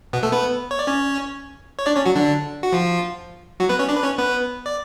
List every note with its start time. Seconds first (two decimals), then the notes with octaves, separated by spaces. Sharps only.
0.13 B2 B3
0.23 A3 A4
0.32 B3 B4
0.71 C#5
0.79 D5
0.87 C#4 C#5
1.79 C#5
1.86 D4 D5
1.96 C#4 C#5
2.05 F#3 F#4
2.15 D3 D4
2.63 F#4
2.73 F3 F4
3.60 F#3 F#4
3.69 B3 B4
3.79 C#4 C#5
3.88 D4 D5
3.96 B4
4.03 C#4 C#5
4.18 B3 B4
4.66 D5